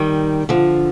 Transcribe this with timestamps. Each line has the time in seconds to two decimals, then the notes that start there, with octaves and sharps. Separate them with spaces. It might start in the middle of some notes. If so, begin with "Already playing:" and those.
Already playing: D#3 G3
0.49 D3 F3